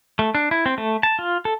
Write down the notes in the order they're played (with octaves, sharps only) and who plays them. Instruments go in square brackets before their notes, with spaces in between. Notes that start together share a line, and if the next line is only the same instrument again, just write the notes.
[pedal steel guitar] A3
D4
E4
C4
A3
A5
F4
A4